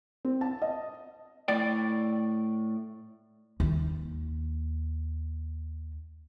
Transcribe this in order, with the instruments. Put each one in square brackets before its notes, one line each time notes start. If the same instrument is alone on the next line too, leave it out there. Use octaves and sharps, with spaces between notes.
[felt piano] C4
A5
D#5
[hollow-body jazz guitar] A2 D5 G5
[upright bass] D#2 C#4